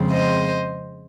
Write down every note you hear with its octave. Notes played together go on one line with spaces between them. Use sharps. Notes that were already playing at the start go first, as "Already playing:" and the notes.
Already playing: F2 C#3 F3 G#3 C4
C5 D#5